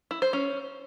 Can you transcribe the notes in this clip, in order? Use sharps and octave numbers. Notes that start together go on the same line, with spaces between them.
E4
C5
C#4